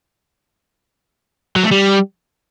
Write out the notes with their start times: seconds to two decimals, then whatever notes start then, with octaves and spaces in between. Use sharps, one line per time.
1.56 F#3
1.64 A3
1.71 G3